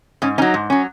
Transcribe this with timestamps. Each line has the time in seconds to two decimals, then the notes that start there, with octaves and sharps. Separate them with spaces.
0.22 G#2 C#4
0.38 C#4 D#4
0.42 F#3
0.54 G#2
0.70 F#3 C#4